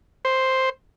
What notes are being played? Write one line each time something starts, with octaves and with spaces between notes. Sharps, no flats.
C5